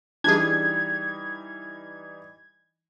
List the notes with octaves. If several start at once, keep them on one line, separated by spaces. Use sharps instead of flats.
E3 G3 D4 D#4 G#4 G#6